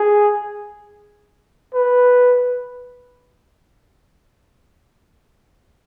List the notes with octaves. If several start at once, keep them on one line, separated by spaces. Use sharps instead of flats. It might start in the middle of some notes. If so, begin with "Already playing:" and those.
Already playing: G#4
B4